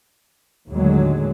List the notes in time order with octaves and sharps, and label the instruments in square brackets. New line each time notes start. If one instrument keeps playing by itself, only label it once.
[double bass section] D#2 A2 D3 F#3 G#3